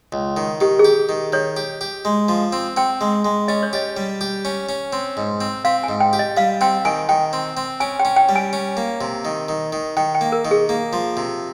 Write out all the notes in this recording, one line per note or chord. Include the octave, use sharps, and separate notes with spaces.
C#2
D#3
D#3 G4
G#4
G4
D#3
D#3 C#5
G4
G4
G#3
F3
C4
C4 G5
G#3
G#3
C#4 D#5
C#5
G4 D#5
G3
G4
C#4
C#4
C4
G#2
C4
C4 F5
G#5
G#2
G5
G4
D#5
G3 F5
C4 G5
D#3 G#5
D#3 G5
C4
C4
C#4 G#5
G5
C#4
G5
G3
G#5
C#4
A#3
C3
D#3
D#3
D#3
D#3 G5
G5
A#3
A#4
D#3
G#4
A#3
F3
C3